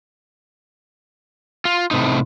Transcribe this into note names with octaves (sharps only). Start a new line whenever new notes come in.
F4
A2 C3 D#4